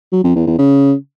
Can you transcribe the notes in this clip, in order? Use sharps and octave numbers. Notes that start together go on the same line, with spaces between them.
F#3
F2
E2
E2
C#3